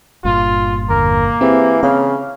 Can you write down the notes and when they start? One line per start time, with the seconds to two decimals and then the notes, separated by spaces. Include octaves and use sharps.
0.24 G1 G2 A#2 F4
0.90 E2 D3 A#3 A#4
1.41 E3 C4 G4 G#4
1.83 C#3 C4 F5 F6